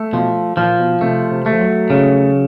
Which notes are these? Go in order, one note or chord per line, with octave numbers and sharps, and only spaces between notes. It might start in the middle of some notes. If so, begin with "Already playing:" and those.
Already playing: A3
B2 F3
A#2 F3
B2
C3 A3
C3
A3
F3
F#3
C#3